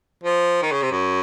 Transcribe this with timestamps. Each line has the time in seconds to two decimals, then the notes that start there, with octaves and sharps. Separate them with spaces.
0.23 F3
0.62 D#3
0.72 C#3
0.82 C3
0.92 F#2